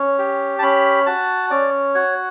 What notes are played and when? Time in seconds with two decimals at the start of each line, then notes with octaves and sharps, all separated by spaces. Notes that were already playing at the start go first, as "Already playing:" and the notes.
Already playing: C#4
0.19 G4
0.59 A5
0.62 C#4 B5
1.06 F#4 A5
1.50 C#4 D5
1.95 F#4 C#5